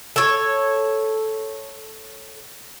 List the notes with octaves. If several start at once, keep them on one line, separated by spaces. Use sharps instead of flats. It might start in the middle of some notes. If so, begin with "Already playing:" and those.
A4 C#5